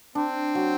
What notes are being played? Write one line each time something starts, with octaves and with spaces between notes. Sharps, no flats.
C4 D4
F#3